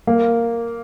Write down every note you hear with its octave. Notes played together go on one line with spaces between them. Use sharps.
A#3